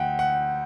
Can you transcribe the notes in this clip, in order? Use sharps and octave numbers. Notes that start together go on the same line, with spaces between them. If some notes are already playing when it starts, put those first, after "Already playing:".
Already playing: D2 F#5 G5
F#5